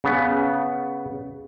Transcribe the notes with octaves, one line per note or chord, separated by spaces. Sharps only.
C#3 B3